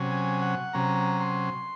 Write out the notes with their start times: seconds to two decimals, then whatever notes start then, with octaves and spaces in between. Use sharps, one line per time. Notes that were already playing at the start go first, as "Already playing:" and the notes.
Already playing: C3 F#3 C#4
0.11 G#5
0.42 F#5
0.73 C3 F#3 C#4 A#5
1.20 C6